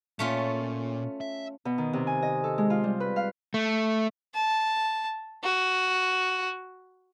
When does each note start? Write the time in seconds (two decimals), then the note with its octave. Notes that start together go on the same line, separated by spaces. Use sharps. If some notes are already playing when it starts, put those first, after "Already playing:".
0.19 A#2 A3 C#4 F4
1.21 E5
1.65 B2
1.78 D#3
1.93 C3
2.07 G#5
2.22 D#5
2.44 A4
2.58 G#3
2.70 F4
2.84 G3
3.00 B4
3.16 F5
3.54 A3
4.34 A5
5.43 F#4